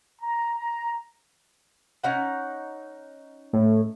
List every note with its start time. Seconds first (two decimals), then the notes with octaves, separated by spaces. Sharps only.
0.21 A#5
0.58 A#5
2.04 C#4 D#4 F#5
3.53 A2